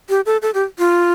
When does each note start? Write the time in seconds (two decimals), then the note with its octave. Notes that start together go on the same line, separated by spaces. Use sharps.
0.09 G4
0.26 A4
0.42 A4
0.54 G4
0.79 F4